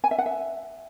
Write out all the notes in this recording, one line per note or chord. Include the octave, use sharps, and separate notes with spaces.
G#5
E5
F#5
E5